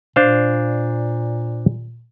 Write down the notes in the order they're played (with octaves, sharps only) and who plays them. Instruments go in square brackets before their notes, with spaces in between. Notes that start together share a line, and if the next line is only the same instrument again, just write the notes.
[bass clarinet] A#2 [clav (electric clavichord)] D4 C5 F5